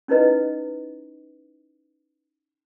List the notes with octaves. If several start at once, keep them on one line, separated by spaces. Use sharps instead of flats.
C#4 D#4 E4 B4 D#5